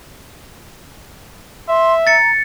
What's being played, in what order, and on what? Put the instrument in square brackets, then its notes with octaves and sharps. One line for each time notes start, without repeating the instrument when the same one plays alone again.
[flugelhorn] E5 [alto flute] C6
[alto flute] A#5 [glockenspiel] A6 C#7